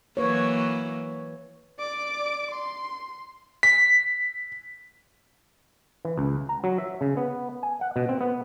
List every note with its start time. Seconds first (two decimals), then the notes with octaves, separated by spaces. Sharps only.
0.17 E3 F#3 A#3 B4 C#5
1.79 D5 D6
2.52 C6
3.63 B6
6.05 E3
6.18 C#2
6.49 A#5
6.64 F#3
6.78 E5
7.01 C#3
7.17 B3
7.63 G#5
7.81 F#5
7.96 B2
8.09 C4
8.21 B3